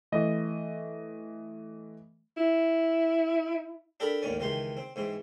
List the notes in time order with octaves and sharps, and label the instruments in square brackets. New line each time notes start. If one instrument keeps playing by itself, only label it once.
[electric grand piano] E3 A3 D#5
[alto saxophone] E4
[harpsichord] D4 G4 A4 A#4 B5
A1 D#2 D#3 C#4 D5
C#2 D#3 E3 G4 C6
C4
G#2 E3 C4